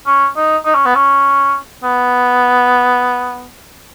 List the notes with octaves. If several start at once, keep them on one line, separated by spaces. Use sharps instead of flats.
C#4
D#4
D#4
C#4
B3
C#4
B3